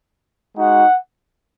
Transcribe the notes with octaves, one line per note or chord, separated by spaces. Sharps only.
G#3 D#4 F#4 F#5